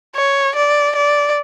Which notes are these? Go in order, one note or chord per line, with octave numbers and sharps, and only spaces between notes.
C#5
D5
D5